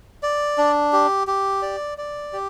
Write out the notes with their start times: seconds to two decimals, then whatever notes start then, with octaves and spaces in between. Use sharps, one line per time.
0.23 D5
0.58 D4
0.93 G4
1.27 G4
1.62 D5
1.98 D5
2.33 G4